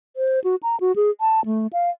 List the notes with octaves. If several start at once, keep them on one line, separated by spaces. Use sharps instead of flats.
C5
F#4
A#5
F#4
G#4
A5
A3
F5